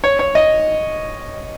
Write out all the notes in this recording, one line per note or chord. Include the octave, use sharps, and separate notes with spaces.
C#5
C#5
D#5